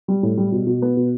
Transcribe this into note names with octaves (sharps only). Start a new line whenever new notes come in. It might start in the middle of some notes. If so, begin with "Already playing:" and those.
G3
A2
G3
B2
B2
B3
B2